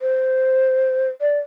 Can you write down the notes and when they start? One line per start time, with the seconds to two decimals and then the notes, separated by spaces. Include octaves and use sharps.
0.01 C5
1.21 D5